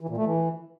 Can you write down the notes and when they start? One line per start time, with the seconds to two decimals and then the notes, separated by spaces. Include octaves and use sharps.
0.01 E3
0.09 A#2
0.17 A3
0.26 E3